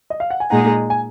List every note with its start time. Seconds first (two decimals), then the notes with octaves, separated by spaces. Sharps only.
0.10 D#5
0.20 F5
0.30 F#5
0.40 G#5
0.50 A#2 G#3 D#4 G#4 F#5 A#5
0.90 G#5